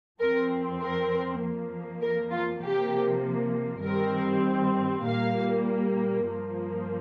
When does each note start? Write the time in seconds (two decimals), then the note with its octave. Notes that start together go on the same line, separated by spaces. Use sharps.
0.20 F2 F3 C4 A#4
0.81 A#4
1.42 F2 F3 A#3
2.01 A#4
2.32 F4
2.62 C3 F3 A#3 G4
3.83 G2 D#3 G3 C4 A#4
5.05 A#2 G3 A#3 F5
6.27 G2 F3 A#3